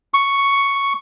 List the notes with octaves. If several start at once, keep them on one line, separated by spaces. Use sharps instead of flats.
C#6